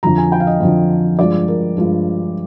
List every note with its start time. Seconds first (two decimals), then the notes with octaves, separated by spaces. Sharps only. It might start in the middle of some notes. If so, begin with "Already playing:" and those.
0.03 F2 D3 F3 A#5
0.18 G#5
0.32 G5
0.40 F5
0.47 D#5
0.60 F2 D3 F3
1.18 G2 F3 G#3 D5
1.48 A#4
1.77 G2 F3 G#3